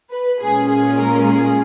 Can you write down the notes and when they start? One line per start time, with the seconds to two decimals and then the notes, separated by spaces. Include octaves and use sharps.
0.11 B4
0.41 A#2 G#3 C#4 F4 G#4
0.69 G#4
0.98 A#4
1.27 G#4